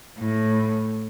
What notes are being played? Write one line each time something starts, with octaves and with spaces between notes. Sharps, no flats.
A2